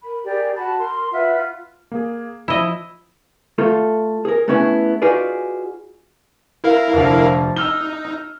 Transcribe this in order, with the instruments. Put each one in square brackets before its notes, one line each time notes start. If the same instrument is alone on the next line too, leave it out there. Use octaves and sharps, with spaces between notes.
[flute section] A#4 B5
G4 G#4 A#4 D5
F#4 A5 B5
A#4 C6
F4 B4 E5 F#5
F4
[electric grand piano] A#3 G#4
[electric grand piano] F3 E7 [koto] E4 D#5
[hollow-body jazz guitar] A3 F4 A4
G#4 A#4
A3 B3 C#4 E4 G#4
D#4 F4 F#4 G#4 B4 D5
[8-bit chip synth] E4 A#4 F5
[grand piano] F1 D3 F3
[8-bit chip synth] D#4 [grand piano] E6 F6 G7